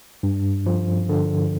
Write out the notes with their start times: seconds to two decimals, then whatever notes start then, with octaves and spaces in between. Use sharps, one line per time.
0.23 G2
0.66 F3
1.09 D3